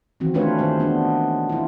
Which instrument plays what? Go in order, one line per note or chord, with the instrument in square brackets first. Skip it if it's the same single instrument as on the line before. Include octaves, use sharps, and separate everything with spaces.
[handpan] D#3 E3 C4 F#4
A3 C#4 D4 F4 B4 C#5
D#3 G#3 C5
B3 D4
E4 F4